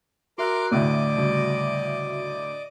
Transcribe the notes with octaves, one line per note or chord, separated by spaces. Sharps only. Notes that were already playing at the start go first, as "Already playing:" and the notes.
F#4 A#4 E5 C6 D6 F#6
D2 A2 D5 D#5 D6
C#3 G3 F#4